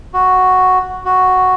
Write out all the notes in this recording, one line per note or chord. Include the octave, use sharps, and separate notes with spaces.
F#4
F#4